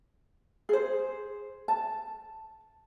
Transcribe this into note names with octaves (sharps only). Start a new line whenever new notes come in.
G#4 C5
A5